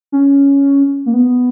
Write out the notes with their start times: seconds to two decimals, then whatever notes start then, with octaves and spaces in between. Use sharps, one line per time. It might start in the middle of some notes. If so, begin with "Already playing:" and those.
0.12 C#4
1.06 A#3
1.14 B3